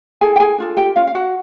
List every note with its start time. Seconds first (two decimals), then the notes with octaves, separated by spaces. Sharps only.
0.21 E4 G#4 A4 G#5
0.36 G5
0.40 G#4 G#5
0.58 D4 F4 A4
0.77 G4 G5
0.96 C#4 F4 F5
1.07 F5
1.15 F#4 F#5